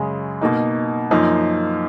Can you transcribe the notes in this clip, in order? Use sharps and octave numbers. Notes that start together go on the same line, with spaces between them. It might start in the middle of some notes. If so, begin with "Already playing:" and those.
Already playing: F#2 C#3 G#3
B2 A#3 D#4
F#2 F3 A#3 D#4